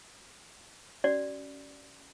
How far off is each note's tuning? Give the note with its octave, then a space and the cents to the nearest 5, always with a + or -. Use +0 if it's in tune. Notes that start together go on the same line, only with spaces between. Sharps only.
C#4 +10 F#4 +40 D5 +0